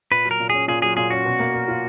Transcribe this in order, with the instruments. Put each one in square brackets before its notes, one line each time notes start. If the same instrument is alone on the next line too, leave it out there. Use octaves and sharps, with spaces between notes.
[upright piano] A#2 [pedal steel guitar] B4
[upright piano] F#3
[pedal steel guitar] A#4
[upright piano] A#2
[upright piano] C#4 [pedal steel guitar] G#4
[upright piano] A#2 [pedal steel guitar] G#4
[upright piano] F#3 [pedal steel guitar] G#4
[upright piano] A#2 [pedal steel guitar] G#4
[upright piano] C#4 [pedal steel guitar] F#4
[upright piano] B2
A#3
A#4
F4